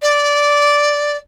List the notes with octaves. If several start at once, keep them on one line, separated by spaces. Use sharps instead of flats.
D5